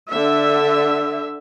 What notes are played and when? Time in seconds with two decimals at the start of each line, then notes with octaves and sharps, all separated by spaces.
0.11 D3 E5